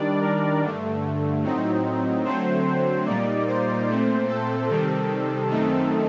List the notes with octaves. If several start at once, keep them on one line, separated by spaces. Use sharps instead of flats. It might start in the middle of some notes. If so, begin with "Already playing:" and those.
Already playing: D#3 G3 D4 D5
A#4
G2 D3 A3
A2 F#3 C4 D#4
D3 F#3 A3 C4 C5
A#2 G3 A#3 D#4 D5
C5
A#2 A3 C4
A4
C3 D#3 G3 C4
F#2 D#3 A3 C4 D#4